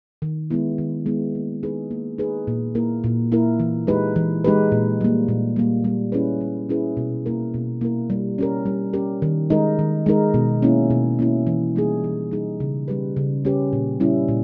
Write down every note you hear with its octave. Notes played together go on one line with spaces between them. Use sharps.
D#3
G#3 B3 E4
D#3
G#3 B3 E4
A#3
D#4 G#4 B4
A#3
D#4 G#4 B4
A#2
A#3 E4 A#4
A#2
A#3 E4 A#4
E3
G#3 D#4 G4 B4
E3
G#3 D#4 G4 B4
A#2
G3 A#3
A#2
G3 A#3
G3
C#4 E4 G#4 B4
G3
C#4 E4 G#4 B4
B2
A#3 E4 A#4
B2
A#3 E4 A#4
G3
C#4 G4 A#4
G3
C#4 G4 A#4
D#3
G#3 D#4 A#4
D#3
G#3 D#4 A#4
B2
A#3 C#4 E4
B2
A#3 C#4 E4
E3
G3 A#3 D#4 G#4
E3
G3 A#3 D#4 G#4
C#3
G3 C#4 G4 B4
C#3
G3 C#4 G4 B4
A#2
G3 C#4 E4
A#2